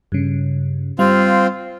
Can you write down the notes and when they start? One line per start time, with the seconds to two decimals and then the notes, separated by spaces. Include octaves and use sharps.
0.12 G2 C#3
0.99 G3 C4 F4 F5